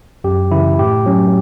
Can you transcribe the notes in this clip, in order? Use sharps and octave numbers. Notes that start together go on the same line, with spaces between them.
F#2 G4
C#3 E3 E4
A2 G4
F#3 C#4